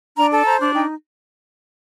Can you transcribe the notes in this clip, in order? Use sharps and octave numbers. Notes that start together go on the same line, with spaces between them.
D4 A#5
A4
C5 A#5
D4
D#4 G5